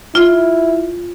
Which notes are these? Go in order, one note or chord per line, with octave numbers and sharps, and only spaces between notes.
E4 F4